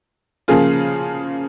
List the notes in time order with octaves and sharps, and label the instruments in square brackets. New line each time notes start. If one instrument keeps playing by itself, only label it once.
[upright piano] C#3 F3 A#3 F4 G#4